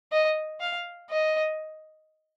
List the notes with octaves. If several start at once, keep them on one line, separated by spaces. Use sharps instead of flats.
D#5
F5
D#5